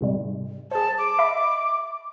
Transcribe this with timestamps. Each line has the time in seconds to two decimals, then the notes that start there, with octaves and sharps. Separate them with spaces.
0.01 G#2 C3 G3
0.71 G#4 C5 A5
0.98 D6
1.18 D#5 E5 B5